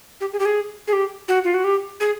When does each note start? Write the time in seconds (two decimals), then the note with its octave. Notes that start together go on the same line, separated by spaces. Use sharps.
0.21 G4
0.33 G#4
0.39 G4
0.45 G#4
0.88 G#4
0.93 G4
1.28 F#4
1.44 F4
1.54 F#4
1.64 G4
2.00 G#4